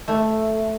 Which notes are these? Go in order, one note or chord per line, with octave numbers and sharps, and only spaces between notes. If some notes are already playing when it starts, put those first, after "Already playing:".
A3